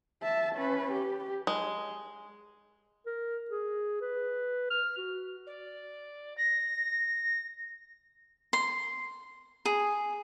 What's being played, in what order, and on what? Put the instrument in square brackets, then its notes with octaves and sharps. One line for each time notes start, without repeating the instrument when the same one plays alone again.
[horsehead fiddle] E5 A5
C#4 B4
G4
[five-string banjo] G#3
[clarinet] A#4
G#4
B4
F6
F#4
[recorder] D5
A#6
[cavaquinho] C6
G#4